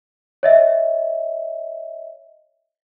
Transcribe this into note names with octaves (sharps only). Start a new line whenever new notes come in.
C#5 D#5 E5